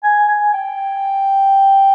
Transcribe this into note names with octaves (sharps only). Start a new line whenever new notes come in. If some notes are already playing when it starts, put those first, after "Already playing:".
G#5
G#5
G5